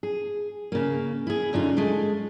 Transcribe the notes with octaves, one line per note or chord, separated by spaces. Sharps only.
G#4
C#3 A#3
E4 G#4
F#2 D3 D#4 F4
G#3 A3